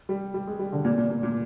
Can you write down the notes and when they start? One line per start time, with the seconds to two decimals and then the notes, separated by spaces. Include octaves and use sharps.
0.09 G3
0.34 G3
0.47 G#3
0.59 G3
0.72 D3
0.85 A#2
0.98 A#2
1.10 A#2
1.23 A#2